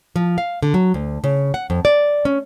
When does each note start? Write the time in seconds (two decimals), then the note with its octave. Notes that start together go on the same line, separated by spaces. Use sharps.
0.16 F3
0.38 F5
0.62 D3
0.74 F#3
0.94 D2
1.24 C#3
1.54 F#5
1.70 F2
1.85 D5
2.25 C#4